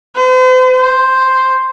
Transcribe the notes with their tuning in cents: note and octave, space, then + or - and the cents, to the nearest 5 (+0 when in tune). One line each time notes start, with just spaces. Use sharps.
C5 -40
C5 +0